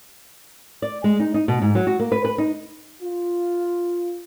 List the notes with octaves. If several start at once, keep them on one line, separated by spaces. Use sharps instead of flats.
D5
G#3
D#4
D#4
B2
G#2
F#3
F#4
A#3
B4
B4
D#4
F4